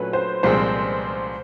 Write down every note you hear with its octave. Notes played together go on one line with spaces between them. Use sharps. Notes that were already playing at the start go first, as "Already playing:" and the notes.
Already playing: A#2 F#3 A3 C#4 B4
C5
C2 A#2 F3 G#3 C4 C5